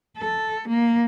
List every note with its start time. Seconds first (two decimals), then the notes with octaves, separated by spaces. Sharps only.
0.19 A4
0.69 A#3